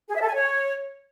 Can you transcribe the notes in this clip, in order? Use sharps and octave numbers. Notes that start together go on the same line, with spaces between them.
G#4
E5
A4
G#5
C#5